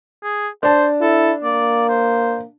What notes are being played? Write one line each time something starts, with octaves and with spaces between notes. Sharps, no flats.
G#4
D4 C5 A5
E4 A4
A#3 D5
C5